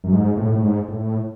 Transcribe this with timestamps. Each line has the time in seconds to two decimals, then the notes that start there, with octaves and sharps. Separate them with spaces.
0.04 F#2
0.12 G#2
0.37 A2
0.52 A2
0.62 G#2
0.88 A2